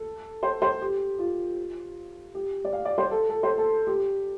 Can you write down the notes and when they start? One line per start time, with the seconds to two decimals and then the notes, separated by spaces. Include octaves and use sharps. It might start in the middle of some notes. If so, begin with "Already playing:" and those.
Already playing: A4
0.43 C5
0.62 C5
0.81 G4
1.19 F4
2.35 G4
2.65 D5
2.73 F5
2.85 D5
2.98 C5
3.11 A4
3.30 A4
3.43 C5
3.58 A4
3.87 G4